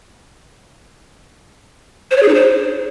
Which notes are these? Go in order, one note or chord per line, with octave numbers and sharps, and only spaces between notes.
C5
C#5
G#4
D#4
C5